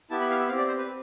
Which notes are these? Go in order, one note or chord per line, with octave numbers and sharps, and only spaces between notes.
B3 E4 G4 A5
B5
F5
E5
C4 G4 F5
D5
C5
B4
C4